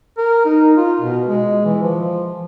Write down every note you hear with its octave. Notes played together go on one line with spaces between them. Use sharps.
A#4
D#4
F4
B2
G#3
E3
F3